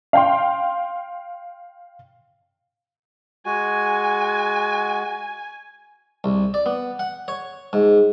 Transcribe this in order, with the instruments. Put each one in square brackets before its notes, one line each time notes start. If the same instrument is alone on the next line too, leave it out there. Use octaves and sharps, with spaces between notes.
[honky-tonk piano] F5 G5 C6
[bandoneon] G#3 F#4 [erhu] G#5
[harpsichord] C2
D5
B3
F#5
C#5
G#2